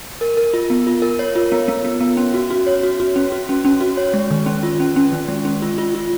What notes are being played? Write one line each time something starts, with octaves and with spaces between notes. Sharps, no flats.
A#4
A#4
F4
B3
F4
A#4
C#5
F4
B3
B3
B3
B3
C#4
F#4
F#4
C#5
F#4
F#4
C#4
F#4
C#4
C#4
F#4
C#5
G#3
D#3
C#4
F4
C#4
C#4
D#3
G#3
C#4
F4
F4
F4